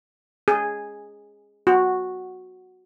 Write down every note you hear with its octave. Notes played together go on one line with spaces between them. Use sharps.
G#4
F#4